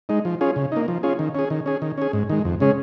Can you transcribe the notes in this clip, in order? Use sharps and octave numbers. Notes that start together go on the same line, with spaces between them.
G#3 D#4
F3
C#4 F4 G#4
C#3
A#3 D#4
F3
C#4 F4 G#4
D#3
C#4 G#4
D#3
C#4 G#4
D#3
C#4 G#4
G#2
D#3 G#3
F2
C#3 G#3 C#4 G#4